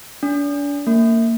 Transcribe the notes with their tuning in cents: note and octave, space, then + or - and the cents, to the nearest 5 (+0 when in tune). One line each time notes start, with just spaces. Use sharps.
D4 -35
A#3 -30